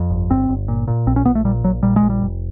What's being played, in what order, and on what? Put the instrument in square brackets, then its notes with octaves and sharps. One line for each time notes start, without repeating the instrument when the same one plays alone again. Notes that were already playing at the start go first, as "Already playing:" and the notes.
Already playing: [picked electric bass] F2
G1
G1 C4
G1
A#2
A#2
A#1 C4
C#4
A#1 B3
A3
A#2 G3
A#1 F#3
A#2 G3
G#3
A#1
G3
F1